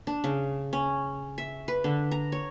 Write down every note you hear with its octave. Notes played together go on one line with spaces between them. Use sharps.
D4
C#3
C#4
E5
B4
D3
A#5
C#5